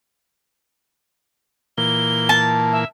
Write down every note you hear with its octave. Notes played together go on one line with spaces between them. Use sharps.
A#2 E3 A#3 G7
A5
E5